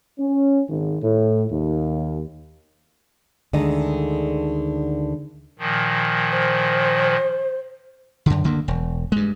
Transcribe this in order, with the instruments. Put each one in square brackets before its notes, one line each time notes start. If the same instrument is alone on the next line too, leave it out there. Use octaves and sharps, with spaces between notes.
[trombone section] C#4
G#1
A2
D#2
[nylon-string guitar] D2 D3 D#3 G#3 G#4 D#5
[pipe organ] A#2 D#3 F3
[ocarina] C5
[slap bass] F#2 D3
D2 D3 A#3
E1
G2 G#3